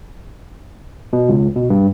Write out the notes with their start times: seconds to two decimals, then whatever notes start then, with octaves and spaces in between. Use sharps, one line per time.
1.13 B2
1.29 C#2
1.56 B2
1.70 G2